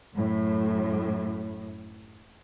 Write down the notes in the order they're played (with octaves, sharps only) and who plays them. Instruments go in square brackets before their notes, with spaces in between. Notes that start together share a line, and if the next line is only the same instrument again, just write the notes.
[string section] F#2 A2